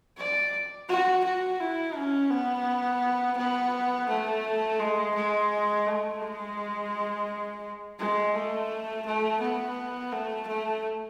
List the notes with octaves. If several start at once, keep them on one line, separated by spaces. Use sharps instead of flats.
D5
F#4
F#4
E4
C#4
B3
B3
A3
G#3
G#3
A3
G#3
G#3
A3
A3
B3
A3
A3